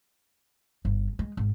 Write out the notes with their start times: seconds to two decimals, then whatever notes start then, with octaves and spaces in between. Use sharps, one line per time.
0.85 G1
1.19 G#3
1.37 G#1